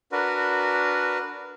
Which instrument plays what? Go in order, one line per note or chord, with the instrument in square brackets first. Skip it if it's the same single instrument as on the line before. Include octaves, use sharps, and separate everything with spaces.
[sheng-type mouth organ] D4 F#4 A#4 B4